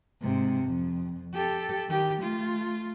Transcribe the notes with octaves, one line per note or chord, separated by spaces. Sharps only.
G#2 C3
F2
G4 A4
D#3 G4
A3 F4